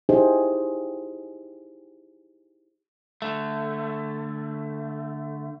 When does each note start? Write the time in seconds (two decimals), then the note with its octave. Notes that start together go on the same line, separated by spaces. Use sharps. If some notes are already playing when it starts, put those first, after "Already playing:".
0.09 D#4 E4 G4 G#4 C5
3.22 D3 A3